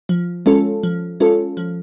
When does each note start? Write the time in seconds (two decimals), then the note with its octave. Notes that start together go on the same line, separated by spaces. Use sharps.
0.09 F3
0.46 G#3 C#4 F4 A4
0.83 F3
1.20 G#3 C#4 F4 A4
1.57 F3